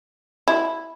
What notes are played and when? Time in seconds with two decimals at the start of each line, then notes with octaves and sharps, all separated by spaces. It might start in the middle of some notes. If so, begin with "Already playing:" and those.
0.48 E4